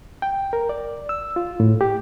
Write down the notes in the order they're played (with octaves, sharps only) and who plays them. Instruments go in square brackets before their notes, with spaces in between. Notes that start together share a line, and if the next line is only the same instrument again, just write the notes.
[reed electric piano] G5
A#4
D5
E6
F4
A2
G4